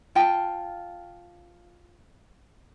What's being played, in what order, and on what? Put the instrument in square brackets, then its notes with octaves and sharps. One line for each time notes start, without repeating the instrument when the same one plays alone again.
[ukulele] F4 F5 G5 A5